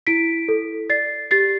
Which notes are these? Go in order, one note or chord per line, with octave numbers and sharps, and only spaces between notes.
E4 B6 D7
A4
D5 A6 C7
G4 A6 C7